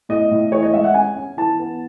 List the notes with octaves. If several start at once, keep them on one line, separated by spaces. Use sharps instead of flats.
A2 D#5
A2
E3 C#5
D#5
G#3 E5
F#5
C#4 G#5
C#4
E3 A5
B3